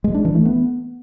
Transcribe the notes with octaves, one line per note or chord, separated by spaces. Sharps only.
G#3
D4
E3
A3
B3